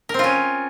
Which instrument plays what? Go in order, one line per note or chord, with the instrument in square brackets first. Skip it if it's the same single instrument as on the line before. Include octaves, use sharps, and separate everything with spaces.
[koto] A#4
C4
F4
C#4